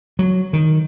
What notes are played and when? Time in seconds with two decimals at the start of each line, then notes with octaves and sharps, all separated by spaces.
0.19 F#3
0.53 D#3